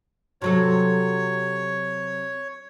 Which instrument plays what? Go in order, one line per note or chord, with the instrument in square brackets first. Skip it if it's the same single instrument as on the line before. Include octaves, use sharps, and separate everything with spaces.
[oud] C3 F#3 A4 [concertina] C#5